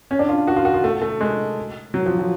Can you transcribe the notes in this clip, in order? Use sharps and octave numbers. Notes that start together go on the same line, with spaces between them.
C#4
D4
F4
F#4
F4
F#4
F4
A3
A3
G#3
F#3
F3
F3